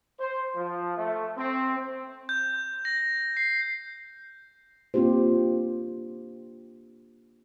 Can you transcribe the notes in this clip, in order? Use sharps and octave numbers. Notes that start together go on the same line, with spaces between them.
C5
F3
A3
C4
G6
A#6
C7
A#3 C4 D4 F4 G4 C5